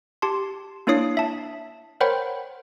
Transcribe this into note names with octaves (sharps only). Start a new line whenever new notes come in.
G4 A5 C6
A#3 D4 E4 C#5 D#6 C7
E5 A5
A#4 C5 C#5 F#5 G5 B5